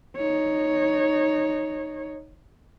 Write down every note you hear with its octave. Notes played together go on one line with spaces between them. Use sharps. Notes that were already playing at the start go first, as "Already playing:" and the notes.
D#4 C#5